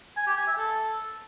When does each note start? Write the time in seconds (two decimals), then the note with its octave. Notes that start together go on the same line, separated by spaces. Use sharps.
0.17 G#5
0.27 G4
0.37 G#5
0.48 E5
0.58 A4